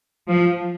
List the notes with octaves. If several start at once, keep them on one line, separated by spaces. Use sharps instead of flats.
F3